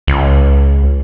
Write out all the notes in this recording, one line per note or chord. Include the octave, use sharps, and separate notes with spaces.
C#2